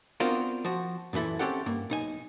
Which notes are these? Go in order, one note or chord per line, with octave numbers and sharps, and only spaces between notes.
B3 C4 D4 F4 F#4 A#4
F3 F#4
F#2 A#2 E3 E4 A4
C4 C#4 D#4 G4 A4 F#5
G2 A#3
B1 D#4 G#5